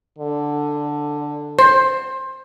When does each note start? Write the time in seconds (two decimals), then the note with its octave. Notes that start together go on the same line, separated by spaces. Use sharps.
0.18 D3
1.59 C5